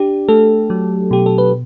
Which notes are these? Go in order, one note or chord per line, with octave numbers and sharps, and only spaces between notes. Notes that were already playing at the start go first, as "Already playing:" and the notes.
Already playing: D4 G4
A3 A4
F#3
B2 G4
A4
B4